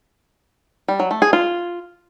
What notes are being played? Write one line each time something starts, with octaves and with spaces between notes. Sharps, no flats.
G3
F#3
A3
G#4
F4